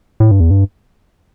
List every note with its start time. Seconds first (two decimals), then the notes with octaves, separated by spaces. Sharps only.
0.20 A2
0.31 G2
0.40 E2
0.51 G2